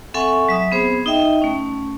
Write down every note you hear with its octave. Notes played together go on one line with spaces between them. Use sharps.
C4 A4 E5 F#5 G#5 C#6
F#3 E5 D#6
B3 C4 G#4 C5
D#4 D#5 E5 G5
A3 C#4